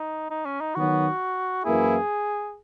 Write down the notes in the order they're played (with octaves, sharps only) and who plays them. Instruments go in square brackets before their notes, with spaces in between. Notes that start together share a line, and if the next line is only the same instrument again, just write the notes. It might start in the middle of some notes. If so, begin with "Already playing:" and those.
Already playing: [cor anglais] D#4
D#4
C#4
D#4
[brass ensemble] D#3 F#3 B3 [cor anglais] F#4
[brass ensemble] F#2 E3 A#3 E4 [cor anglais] G#4